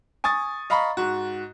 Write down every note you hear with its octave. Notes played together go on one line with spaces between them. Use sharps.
G#5 C#6 D#6 A6
D#5 F5 A#5 B5 C#6
G#2 F#4